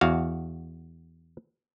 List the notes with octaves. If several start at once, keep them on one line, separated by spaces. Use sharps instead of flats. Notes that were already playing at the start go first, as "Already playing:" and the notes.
E2 F#4 F5